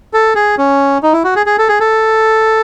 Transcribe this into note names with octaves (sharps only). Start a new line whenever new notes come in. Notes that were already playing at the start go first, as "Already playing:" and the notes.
A4
G#4
C#4
D#4
E4
F#4
G#4
G#4
A4
G#4
A4